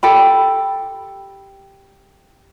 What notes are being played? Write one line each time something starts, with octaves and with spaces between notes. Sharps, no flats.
G4 A4 G5 B5